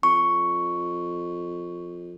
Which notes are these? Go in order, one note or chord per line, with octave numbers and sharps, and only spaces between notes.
F2 C#6